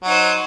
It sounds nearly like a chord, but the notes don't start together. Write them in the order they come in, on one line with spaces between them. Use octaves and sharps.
F#3 D#4 C5